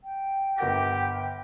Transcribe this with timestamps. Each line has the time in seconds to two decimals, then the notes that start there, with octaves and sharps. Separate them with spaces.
0.04 G5
0.58 G1 G4 A#4 F#5 A#6